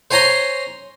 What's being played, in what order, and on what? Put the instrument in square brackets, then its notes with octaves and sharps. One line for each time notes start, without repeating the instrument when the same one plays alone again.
[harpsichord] C5 C#5 G#5 A#5 C6